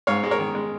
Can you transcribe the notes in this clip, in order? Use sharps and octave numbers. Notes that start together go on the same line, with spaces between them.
G#2 C#5 F5
G#3
A#4 C#5
D#3
G#3